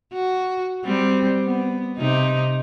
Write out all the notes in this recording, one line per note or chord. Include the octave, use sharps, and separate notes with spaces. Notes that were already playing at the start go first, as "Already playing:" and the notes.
F#4
G3 C4
B3
C3 D#4